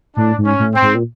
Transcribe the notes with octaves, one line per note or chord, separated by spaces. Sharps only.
A2 D4
G#2
C#4
A2
C4
G#2
A#2